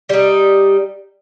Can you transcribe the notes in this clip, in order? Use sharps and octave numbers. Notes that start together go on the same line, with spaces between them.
G3 D#4